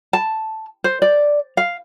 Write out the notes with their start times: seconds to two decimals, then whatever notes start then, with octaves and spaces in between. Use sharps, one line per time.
0.13 A5
0.84 C5
1.02 D5
1.57 F5